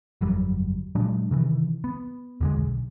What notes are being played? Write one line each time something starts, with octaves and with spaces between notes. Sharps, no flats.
G1 F2 F#3 G3
A#2 F#3 G#3 D4
C3 D#3 E3
B3
E2 D3 G#3
B1